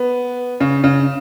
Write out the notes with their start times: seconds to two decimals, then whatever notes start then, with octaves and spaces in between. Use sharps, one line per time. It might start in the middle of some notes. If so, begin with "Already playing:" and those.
Already playing: B3
0.60 C#3
0.84 C#3